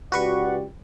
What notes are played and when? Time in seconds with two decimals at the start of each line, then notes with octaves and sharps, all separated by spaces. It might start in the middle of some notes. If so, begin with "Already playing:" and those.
0.12 C#2 F#4 G4 B4 D5 C#6